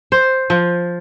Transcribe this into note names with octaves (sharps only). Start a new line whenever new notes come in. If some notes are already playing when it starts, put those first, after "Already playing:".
C5
F3